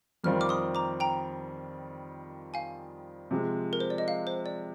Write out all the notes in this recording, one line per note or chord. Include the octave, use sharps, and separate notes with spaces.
F2 D#3 G3 C4 F4 F6
D6 F6
C6 D#6
A#5 D6
G5 A#5
F5 G#5
C3 F3 G#3
A#4
C5
D5
D#5
F5
C5
D5